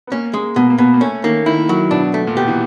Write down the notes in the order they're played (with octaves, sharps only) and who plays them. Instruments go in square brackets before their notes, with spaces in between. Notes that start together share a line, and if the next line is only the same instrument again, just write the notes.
[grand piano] B3
[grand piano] A#3 [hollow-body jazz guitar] C#4
[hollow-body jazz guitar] G#3 [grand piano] A#3
[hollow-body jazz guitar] B2 [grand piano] A#3
[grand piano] A#3
[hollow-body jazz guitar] B2 [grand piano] B3
[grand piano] A#3
[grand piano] A3 [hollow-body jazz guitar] C#4
[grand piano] D#3 [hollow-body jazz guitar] A#3
[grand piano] D#3 [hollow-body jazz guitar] E4
[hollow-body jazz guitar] F#3
[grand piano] B2 [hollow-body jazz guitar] D4
[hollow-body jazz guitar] A3
[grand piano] A#2
[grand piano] B2 [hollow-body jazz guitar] G4
[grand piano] E3